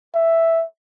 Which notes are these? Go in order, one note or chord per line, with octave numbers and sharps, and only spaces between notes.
E5